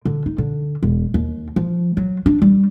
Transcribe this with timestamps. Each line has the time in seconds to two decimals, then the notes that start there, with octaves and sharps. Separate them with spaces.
0.05 D3
0.26 D#4
0.38 D3
0.83 E1
1.14 D#2
1.56 F3
1.97 F#3
2.26 D4
2.42 G3